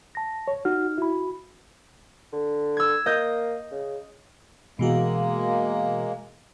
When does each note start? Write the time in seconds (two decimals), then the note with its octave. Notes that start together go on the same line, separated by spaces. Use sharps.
0.15 A5 A#6
0.48 C#5
0.65 D#4 F#4 F6
0.98 E4 F#4 B5
2.33 D3
2.77 E6 G#6
3.06 A#3 D#5 G6
3.71 C#3
4.79 B2 E3 G#3 A#3 F#4